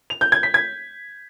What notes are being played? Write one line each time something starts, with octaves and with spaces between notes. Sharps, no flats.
F7
G6
G#6
B6
G#6